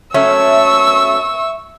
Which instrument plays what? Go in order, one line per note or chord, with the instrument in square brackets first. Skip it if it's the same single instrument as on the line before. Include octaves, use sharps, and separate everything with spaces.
[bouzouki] F#3 A3 C#4 [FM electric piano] E5 [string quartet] C#6 E6